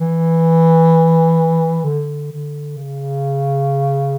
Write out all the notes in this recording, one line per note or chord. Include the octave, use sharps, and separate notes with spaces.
E3
D3
D3
C#3